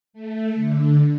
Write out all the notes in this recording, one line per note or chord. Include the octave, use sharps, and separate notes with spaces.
A3
D3